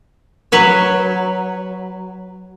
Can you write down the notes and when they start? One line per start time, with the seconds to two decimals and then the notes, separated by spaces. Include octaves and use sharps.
0.52 F#3 B4 C#5